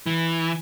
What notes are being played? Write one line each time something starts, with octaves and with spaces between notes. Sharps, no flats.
E3